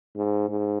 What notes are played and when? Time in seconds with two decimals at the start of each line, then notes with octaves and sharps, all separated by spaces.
0.16 G#2
0.49 G#2